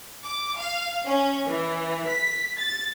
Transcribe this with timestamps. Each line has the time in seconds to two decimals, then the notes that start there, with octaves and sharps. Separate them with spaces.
0.24 D6
0.57 F5
1.05 C#4
1.47 E3
2.07 B6
2.57 A6